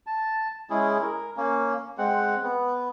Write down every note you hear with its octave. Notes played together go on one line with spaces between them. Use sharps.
A5
G#3 C#4 E4 G#4
A#4
A#3 C#4
G#3 C4 F#5
B3